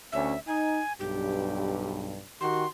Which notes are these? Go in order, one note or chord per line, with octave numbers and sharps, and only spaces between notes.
D2 C#4 E5
D#4 G#5
B1 G2 G4
D#3 F#4 G4 C6